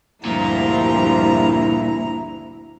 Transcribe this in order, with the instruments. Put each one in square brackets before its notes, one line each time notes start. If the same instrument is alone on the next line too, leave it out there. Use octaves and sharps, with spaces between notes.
[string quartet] D2 G2 A#5 [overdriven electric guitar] A#2 [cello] F3 G3 [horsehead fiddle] E4